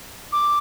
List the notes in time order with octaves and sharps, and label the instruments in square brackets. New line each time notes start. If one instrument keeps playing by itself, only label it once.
[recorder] D6